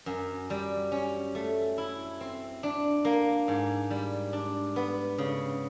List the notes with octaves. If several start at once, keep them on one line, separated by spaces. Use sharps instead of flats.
F#2
G3
C#4
A3
E4
C4
D4
A#3
G#2
G3
D4
B3
C#3